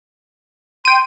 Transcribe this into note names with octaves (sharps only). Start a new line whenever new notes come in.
G5 C6 D#7